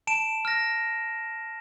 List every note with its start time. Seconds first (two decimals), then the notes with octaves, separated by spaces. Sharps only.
0.07 A5 D7 E7
0.45 F6 A#6